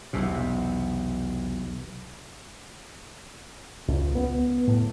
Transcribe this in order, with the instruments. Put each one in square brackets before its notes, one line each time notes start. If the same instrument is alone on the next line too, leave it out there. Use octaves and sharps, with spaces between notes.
[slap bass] B1 E2 C3
[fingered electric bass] C#2
B3
A2